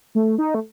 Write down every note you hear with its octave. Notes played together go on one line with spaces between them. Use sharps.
A3
D#4
A3